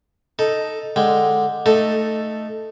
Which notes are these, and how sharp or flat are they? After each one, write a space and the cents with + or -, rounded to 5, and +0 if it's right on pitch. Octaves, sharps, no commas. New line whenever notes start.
D#4 +0 A4 +0
D3 +5 G#3 +0 G5 +0
A3 +0 D#4 -10 A4 +5